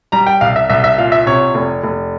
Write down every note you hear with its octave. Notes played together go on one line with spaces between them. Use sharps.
G3 A#5
G5
C2 F5
E5
C2 E5
E5
A#2 F5
E5
C3 C#5
F1
F1